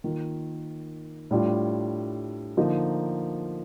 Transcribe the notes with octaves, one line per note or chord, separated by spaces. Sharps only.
D#3 A#3 F4
A2 G3 D4 F4
D3 F3 A#3 D#4